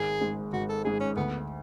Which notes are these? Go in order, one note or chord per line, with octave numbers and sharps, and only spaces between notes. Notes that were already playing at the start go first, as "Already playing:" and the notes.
Already playing: G#1 G#4
G#2 G#3
G#1 F#4
A4
G#2 G#3 G#4
C#4
D2 B3